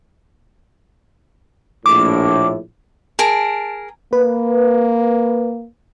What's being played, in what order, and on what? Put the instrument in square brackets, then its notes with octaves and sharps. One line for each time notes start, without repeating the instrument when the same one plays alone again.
[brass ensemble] A#1 A2 [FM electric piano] D6
[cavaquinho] G#4 A#4 [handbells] A5 D7
[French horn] A#3 [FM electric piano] B4